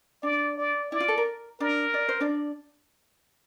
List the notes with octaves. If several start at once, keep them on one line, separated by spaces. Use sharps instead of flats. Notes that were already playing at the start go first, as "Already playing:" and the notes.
D4 D5
D5
E4 D5
F4
A4
A#4
D4 A#4 D5
D5
C5
D4 D5